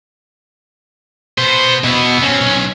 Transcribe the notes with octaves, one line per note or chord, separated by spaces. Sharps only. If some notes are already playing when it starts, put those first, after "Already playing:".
B2 B3 C5
B2 B3 E4
B2 C4 C#4
B1